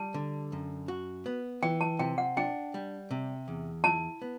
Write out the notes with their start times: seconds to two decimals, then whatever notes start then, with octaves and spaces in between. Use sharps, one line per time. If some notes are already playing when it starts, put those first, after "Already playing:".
Already playing: G3 A5
0.14 D3
0.52 F#2
0.88 F#4
1.26 B3
1.62 E3 G5
1.81 A5
1.99 C3 G5
2.18 F#5
2.37 D4 G5
2.74 G3
3.11 C3
3.48 E2
3.84 E4 A5
4.22 B3